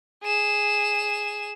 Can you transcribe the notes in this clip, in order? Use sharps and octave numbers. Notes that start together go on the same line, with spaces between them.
G#4 E7